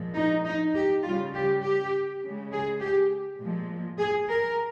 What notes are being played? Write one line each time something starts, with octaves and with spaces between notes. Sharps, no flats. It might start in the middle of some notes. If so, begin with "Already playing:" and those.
Already playing: A#2 F3 G#3
D#4
D#4
G4
C#3 G3 F4
G4
G4
C#3 G#3
G#4
G4
A#2 F3 G#3
G#4
A#4